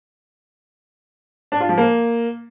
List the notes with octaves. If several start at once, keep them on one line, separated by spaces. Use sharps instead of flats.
D4
F4
F3
A#3